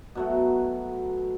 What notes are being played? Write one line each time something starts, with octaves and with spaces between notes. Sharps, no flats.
B2 F#3 A3